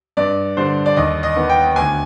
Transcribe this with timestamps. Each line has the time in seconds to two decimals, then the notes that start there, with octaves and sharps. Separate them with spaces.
0.17 G2 D5
0.57 D3 G3 D4 C5
0.86 D5
0.96 D#2 D#5
1.23 D#5
1.36 D#3 B3
1.49 G5
1.76 D2 G#5